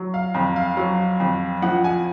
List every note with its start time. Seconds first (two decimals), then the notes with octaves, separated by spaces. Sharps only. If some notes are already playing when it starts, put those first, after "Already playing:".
Already playing: F#3
0.14 F5
0.34 F2 A#5
0.56 F5
0.77 F#3
1.20 F2
1.62 F3 F#5
1.84 G#5